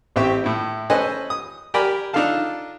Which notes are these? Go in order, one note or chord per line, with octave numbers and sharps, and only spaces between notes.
A1 C4 G4 E5 G5 C#6
A2 E4
C#4 A4 B4 C5 D#5 G#5
D#6
G4 A#4 D5 G#5 B5 D6
D4 D#4 F4 A4 F5 A5